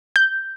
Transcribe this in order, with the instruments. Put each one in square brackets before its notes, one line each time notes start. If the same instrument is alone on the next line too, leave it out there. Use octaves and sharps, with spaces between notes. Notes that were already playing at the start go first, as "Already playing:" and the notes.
[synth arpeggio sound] G6